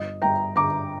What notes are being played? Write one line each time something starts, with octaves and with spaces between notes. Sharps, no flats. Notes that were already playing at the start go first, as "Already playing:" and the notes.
Already playing: G1 D#5
G1 G5 A#5
D3 A#5 D6